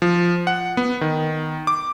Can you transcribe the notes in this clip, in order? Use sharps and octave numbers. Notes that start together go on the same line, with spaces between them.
F3
F#5
B3
D#3
D6